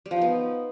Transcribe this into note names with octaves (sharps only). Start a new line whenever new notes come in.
G3
F3
D#4
B3